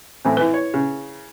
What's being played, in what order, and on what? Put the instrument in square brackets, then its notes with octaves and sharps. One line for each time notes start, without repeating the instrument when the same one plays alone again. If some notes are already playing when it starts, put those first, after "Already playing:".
[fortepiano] A2 E3 C4
[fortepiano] E3 [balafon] E4 B4
[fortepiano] C#5
C#3